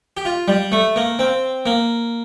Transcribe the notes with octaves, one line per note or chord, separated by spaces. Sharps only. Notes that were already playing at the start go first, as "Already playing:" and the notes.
G4
F4
G3
A3
A#3
C4
A#3